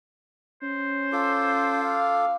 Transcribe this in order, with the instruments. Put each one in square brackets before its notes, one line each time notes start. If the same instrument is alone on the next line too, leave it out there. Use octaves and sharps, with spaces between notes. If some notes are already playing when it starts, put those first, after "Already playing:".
[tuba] C#4 [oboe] C5
[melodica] F4 A4 D6
[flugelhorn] F5